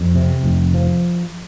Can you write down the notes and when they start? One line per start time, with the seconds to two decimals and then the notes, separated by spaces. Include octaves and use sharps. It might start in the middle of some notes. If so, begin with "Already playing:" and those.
Already playing: F2
0.15 C3
0.44 F1
0.74 F3